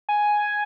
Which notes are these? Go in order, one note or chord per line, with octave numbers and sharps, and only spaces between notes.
G#5